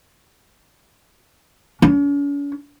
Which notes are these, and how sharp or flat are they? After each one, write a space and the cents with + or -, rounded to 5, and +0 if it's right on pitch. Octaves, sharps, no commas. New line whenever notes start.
C#4 +45